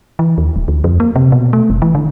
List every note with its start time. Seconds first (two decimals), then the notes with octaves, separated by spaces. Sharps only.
0.19 E3
0.38 D#2
0.56 D1
0.68 D2
0.84 F2
1.00 A#3
1.16 C3
1.32 B2
1.53 A3
1.70 F#1
1.82 E3
1.95 D3